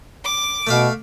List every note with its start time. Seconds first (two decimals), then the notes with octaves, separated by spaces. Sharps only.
0.24 D6
0.67 B2 A3 E5 F5